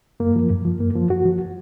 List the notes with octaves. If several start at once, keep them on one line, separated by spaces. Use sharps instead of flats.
F#2 A#3
F3
F#2
F3
F#2 A#3
F3
F#2 F#4
F3